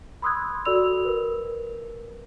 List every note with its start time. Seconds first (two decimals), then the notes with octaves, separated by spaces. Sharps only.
0.22 B5 C6 D#6 E6 F#6 G#6
0.65 F#4 A4 D5 B5 E6 F7
1.05 A#4 B4